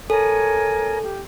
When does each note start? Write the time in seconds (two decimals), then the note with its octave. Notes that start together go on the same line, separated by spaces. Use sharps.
0.10 A4 A#4 C#5 G#5
1.03 G4